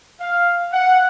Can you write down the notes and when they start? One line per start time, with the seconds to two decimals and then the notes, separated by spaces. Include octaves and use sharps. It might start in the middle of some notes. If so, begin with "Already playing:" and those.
0.21 F5
0.73 F#5